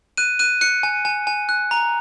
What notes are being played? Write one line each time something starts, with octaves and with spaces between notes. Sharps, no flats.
F#6 D#7
F#6 D#7
F#6 C#7
G#5
G#5
G#5
F#6
A#5